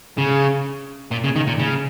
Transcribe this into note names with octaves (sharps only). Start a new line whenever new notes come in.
C#3
A#2
C#3
D#3
A#2
C#3